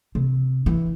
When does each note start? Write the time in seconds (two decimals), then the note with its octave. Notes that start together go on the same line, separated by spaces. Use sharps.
0.15 C3
0.66 E3